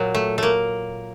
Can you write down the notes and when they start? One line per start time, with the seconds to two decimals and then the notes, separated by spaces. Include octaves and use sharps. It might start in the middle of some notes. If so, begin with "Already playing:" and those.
Already playing: A#2 F#3
0.15 A3
0.38 A3 A#3